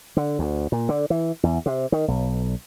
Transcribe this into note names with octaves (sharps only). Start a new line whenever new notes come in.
D3
D2
A#2
D3
E3
E2
C3
D#3
B1